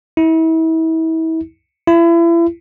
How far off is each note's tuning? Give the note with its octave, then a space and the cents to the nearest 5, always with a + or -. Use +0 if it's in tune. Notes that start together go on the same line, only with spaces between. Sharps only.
E4 -35
E4 +35